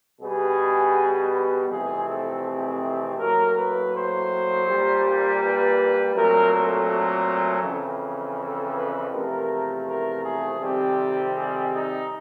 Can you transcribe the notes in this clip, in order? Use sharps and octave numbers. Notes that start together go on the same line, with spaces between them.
B2 G3 B3 G#4
F2 C3 E3 A3 C4 G#4
A4
G#4
A2 F#3 A#3 A#4
B4
C5
A#2 G3 A#3
B4
A#2 F#3 A3 C4 A#4
A4
F2 C#3 E3
A4
B4
E2 C3 F3 A3 A#4
A#4
G#4
F2 C3 D#3 G3 C4 G4
G#4
D#4